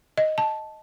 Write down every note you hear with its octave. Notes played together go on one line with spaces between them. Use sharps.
D#5
A5